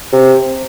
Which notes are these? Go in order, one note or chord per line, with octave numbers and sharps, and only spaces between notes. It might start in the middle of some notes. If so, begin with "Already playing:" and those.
C3